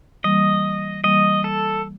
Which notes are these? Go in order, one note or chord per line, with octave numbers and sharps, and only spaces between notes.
E3 G3 A#3 D#5
E3 G3 A#3 D#5
A4